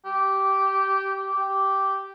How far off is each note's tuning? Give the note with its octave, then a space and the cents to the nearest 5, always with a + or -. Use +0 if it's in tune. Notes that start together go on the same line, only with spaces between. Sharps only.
G4 -15
G4 -10